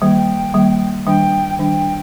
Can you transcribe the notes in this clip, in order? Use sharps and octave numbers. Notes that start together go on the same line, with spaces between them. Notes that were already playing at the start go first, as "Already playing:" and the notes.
D#3 G3 A#3 G5
D#3 G3 A#3
D#3 G3 D4 G5
D#3 G3 D4 G5